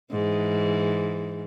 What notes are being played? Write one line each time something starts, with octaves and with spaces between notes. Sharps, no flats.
G#2 E3